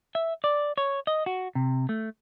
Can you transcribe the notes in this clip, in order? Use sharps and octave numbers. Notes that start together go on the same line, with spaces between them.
E5
D5
C#5
D#5
F#4
C3
A3